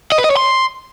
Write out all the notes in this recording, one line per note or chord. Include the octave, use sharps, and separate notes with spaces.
D#5
B4
D#5
C#5
C6